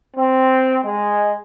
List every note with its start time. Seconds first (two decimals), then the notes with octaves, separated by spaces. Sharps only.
0.15 C4
0.84 G#3